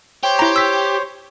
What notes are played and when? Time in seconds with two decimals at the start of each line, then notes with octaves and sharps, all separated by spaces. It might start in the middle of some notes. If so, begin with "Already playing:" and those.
0.24 G4 C5 C#5
0.39 E4 A#5
0.56 E6 B6